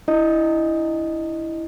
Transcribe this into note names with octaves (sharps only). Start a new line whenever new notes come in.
D4 E4 D#5